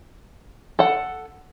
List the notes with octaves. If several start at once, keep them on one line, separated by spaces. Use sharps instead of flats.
A4 F#5